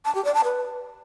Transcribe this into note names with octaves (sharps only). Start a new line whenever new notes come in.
A5
G4
D5
A5
B4